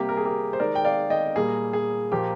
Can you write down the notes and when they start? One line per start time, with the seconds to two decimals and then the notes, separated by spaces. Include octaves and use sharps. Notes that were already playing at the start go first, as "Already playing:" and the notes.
Already playing: C3 G3 A#3 G4
0.09 A#4
0.17 G#4
0.25 G4 A#4
0.53 C5
0.60 D#3 G#3 A#4 D5
0.75 G5
0.85 D5 F5
1.10 D#5 G5
1.35 A#2 G3 A#3 G#4
1.73 G#4
2.12 A#2 F3 A#3 G4